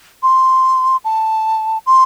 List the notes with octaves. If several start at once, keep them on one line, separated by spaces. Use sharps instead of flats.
C6
A5
C6